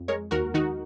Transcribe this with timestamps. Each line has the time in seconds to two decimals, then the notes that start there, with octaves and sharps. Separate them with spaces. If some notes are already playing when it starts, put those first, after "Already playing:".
Already playing: F2
0.08 G#3 A#4 C#5
0.31 D#2 F#4 A#4
0.54 D#3 D#4 F#4